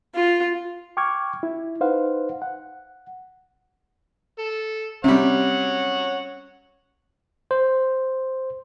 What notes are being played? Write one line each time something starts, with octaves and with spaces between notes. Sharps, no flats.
F4
G5 C#6 D6 F6 G#6
E4
D#4 B4 C5 F5 F#5
F#5
A4
C3 G3 C#4 C#5 F#5
C5